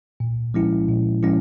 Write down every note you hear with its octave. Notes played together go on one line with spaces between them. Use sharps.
A#2
F3 G#3 C#4 E4
A#2
F3 G#3 C#4 E4